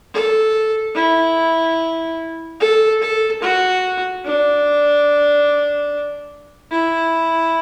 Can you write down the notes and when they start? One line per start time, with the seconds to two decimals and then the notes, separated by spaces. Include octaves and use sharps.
0.14 A4
0.96 E4
2.60 A4
3.02 A4
3.42 F#4
4.25 D4
6.71 E4